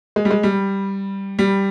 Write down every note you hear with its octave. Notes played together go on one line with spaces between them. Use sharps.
G#3
G3
G#3
G3
G3